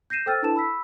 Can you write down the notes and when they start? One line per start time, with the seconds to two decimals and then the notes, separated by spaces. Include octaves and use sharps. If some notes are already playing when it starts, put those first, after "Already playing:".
0.10 G6 A#6 C7 D#7 E7
0.26 A4 C5 G5 E6 F6 A6
0.42 D4 E4 A4 B4 A5 E7
0.56 B5 E6 B6